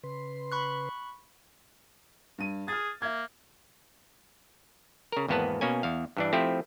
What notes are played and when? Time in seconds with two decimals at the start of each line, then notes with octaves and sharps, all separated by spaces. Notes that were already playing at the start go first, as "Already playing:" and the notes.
0.04 C#3 B4 C6
0.52 B5 C#6 F#6
2.38 G2 D#7
2.68 G#4 F6 A6
3.02 A#3 E5 G#6
5.12 C#3 A#4
5.28 G#1 E2 A#3 B3 B4 A5
5.61 B2 A#3 C#4 G#5
5.83 E2 F5
6.17 G2 E3 D4
6.33 F3 A3 C4 E4 G4